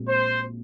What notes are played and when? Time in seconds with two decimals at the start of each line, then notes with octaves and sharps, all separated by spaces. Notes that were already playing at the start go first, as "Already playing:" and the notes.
Already playing: A#1 A#2 G#3 C4 F#4
0.08 C5